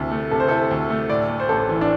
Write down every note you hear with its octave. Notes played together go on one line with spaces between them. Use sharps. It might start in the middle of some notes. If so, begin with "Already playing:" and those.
Already playing: D2 C3 E4 A4
A3
C3 A4
C5
E4 A4
D2
A3
A2 D5
A3
C5
A1 A4
E3
D4